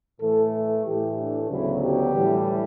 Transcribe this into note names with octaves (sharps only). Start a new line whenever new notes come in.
A2 E3 A3 A4
A4
A2 E3 A3 G4
D4
D2 C#3 F#3 B3 E4
G4
A2 E3 G3